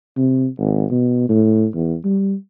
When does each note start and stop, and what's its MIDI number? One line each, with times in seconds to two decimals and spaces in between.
0.17 0.47 48
0.58 0.86 32
0.91 1.27 47
1.29 1.66 45
1.75 1.96 40
2.05 2.34 55